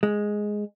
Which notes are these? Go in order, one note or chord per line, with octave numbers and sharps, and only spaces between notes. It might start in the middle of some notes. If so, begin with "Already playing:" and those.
G#3